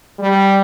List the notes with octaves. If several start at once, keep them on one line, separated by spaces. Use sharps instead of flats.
G3